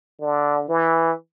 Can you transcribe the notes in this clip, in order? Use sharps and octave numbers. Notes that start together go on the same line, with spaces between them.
D3
E3